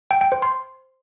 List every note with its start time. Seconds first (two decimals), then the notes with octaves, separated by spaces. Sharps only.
0.11 G5
0.21 G5
0.32 C5
0.42 C6